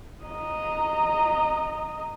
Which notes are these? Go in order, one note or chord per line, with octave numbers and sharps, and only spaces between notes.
D#5 A#5